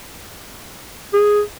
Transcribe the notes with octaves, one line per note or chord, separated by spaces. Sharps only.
G#4